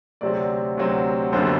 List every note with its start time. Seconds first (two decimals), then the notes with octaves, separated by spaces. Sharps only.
0.21 D2 C3 F#3 C4 D5
0.77 D2 C3 F#3 C4
1.32 F#1 F#2 D3 G3 B3 C5